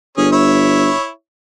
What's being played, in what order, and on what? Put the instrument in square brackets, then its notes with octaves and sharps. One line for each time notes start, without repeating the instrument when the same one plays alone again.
[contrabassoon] G1 [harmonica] C#4 G#4
[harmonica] E4 C#5 E5